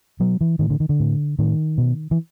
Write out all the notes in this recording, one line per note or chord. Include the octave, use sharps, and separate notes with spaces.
B2 F#3
E3
A2 D#3
D3
D#3
D3
A2
A2 D#3
B2
E3